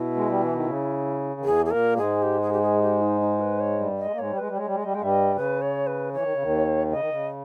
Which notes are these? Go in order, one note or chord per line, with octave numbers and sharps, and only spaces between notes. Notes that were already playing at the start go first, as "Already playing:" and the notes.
Already playing: B2 E4
G#3
G3
E3
D#3
C#3
D#3
E2 E3 G#4
G#4
A#2 A#3 A#4
G#2 G#3 G#4
G4
G#4
G4
G#4
G4
D#4
D#4
B4
C#5
G2 G3
D#5
G#3
A#3
G#2 G#3 C#5
G3
G#3 B4
G3
G#3 C#5
G3
G#3
G3 D#5
G#3 G5
G2 G3 E5
D#5
C#3 B4
C#5
B4
E3 C#5
D#3
C#3
D#2 D#3
C#3 D#5
D#3
C#3